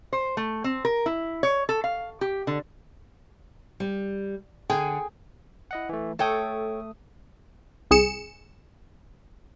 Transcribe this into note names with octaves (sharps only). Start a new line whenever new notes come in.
C5
A3
C4
A#4
E4
C#5
A4
F5
G4
D3
G3
D3 G#4 G5 G#5
E4 D#5 F#5
E3 A3
A3 A4 C#5 G5 D#6
C2 G#4 C#7 E7